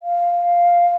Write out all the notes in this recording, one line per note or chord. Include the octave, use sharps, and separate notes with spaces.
F5